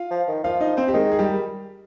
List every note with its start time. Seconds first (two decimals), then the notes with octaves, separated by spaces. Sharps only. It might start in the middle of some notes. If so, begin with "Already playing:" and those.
Already playing: F4 F5
0.11 F3
0.28 D#3
0.44 F3 F4 F5
0.60 D#4 D#5
0.77 C4 C5
0.88 G4
0.94 D#3 G#3 G#4
1.12 G#4
1.19 G3 G4